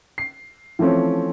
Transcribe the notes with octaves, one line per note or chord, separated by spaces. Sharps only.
C7
E3 F3 A3 C4 C#4